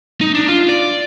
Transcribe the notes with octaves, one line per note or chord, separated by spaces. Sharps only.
D#4
D4
F4
D5